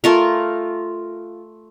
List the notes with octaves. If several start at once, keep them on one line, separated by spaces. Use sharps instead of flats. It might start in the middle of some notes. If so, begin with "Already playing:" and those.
A3 F4 A#4